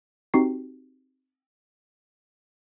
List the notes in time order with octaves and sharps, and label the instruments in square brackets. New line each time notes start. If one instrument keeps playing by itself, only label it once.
[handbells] C4 D#4 F#4 G4 C#6 C7